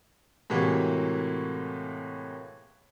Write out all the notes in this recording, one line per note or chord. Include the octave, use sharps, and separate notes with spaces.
A2 C3 E3 G#3 A#3 F#4